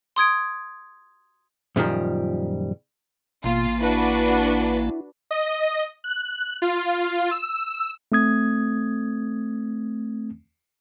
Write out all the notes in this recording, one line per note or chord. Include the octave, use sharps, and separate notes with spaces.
C6 D#6 G#6 D7
F#2 A#2 D#3 F3 G3
A1 B2 A#3 F4
D4 E4 F#4 B4
D#5
F#6
F4
E6
A3 C4 D#6 G#6